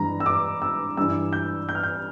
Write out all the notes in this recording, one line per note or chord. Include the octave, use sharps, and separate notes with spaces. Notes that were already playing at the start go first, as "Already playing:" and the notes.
Already playing: G2 E3 A#5
E6
D6
E6
G2 E3 E6
G6
G6
F6
G6